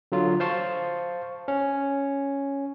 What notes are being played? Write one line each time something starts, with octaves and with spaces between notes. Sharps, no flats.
D3 F#3 F4
C5 F5 A5 C#6
C#4